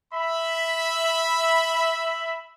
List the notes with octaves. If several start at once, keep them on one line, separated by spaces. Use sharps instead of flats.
E5 B5